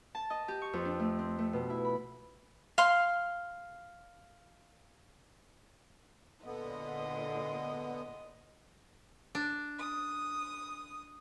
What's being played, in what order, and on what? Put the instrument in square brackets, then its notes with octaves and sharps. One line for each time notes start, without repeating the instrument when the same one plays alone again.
[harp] A5
D#5
G4
C#6
F2
D4
A3
C4
A3
B2
E4
B5
[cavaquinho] F5 C6
[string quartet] A#2 G#3 [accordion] D3 B3 [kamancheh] D#5
[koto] D4
[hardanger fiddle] D#6